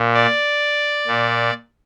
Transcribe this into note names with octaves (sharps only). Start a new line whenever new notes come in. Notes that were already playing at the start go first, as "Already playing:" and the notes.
Already playing: A#2
D5
A#2